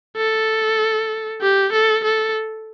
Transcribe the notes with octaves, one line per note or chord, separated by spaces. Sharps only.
A4
G4
A4
A4